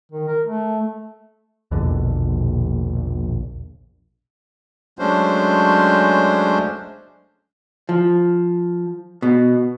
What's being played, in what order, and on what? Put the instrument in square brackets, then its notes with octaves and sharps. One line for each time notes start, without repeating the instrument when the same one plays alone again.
[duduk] D#3
A#4
A3
[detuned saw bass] A#1 [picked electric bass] E2 B2 D3
[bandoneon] F#3 G#3 A3 C#4 D4 C5
[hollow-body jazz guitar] F3
B2